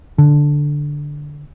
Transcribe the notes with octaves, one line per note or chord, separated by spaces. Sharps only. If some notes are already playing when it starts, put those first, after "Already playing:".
D3